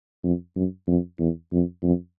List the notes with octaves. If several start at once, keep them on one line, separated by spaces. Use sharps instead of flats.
F2
F#2
F2
E2
F2
F2